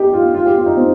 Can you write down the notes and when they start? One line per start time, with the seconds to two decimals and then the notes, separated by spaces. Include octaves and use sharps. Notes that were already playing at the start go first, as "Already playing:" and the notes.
Already playing: D#4 G4
0.13 F4
0.34 F4
0.46 G4
0.56 F4
0.66 D#4
0.77 C4